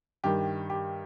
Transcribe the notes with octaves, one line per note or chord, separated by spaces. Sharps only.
G2 D#3 G4
G4